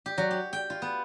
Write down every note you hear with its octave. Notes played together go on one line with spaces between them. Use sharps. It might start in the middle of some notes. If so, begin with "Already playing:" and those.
G4
F#3
G4
G5
F4
B3